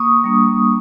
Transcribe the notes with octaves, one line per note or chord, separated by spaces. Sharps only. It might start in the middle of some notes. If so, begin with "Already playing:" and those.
Already playing: A#3 C#6 D#6
G3 A#3 D4